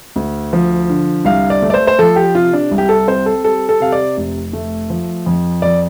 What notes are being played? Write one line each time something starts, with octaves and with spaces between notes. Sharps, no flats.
D2
F3
D3
C2 F5
D5
A3
D5
C5
C5
F3 A4
G4
C3 F4
D4
C2
G4
A4
C4 C5
A4
G3 A4
A4
C3 F5
D5
F1
A3
F3
F2
F2 D5